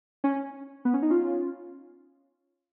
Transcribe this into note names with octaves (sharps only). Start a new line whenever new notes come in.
C#4
B3
C#4
D#4
C#4 F4